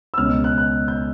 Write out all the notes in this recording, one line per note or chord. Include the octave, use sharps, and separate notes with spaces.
E6
C#2 B2 G#3 C#4 F6
F#6
F#6
G6